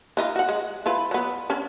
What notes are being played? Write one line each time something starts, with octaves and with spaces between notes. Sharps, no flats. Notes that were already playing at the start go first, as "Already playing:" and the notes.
E3 D#4 F4
F#4 F#5
G#3
E4 F4 B4
F#3 B3
C#4 D4